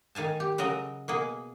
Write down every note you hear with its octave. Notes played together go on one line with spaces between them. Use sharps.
D#3 F5 G#5 A5
G4
C#3 F#3 A#4 D#5
B2 A#3 G#4